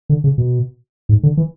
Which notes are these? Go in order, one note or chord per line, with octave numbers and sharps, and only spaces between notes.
D3
C#3
B2
G#2
D3
E3